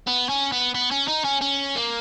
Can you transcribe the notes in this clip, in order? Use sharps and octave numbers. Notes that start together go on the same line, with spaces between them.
B3
C#4
B3
B3
C#4
D#4
C#4
C#4
A#3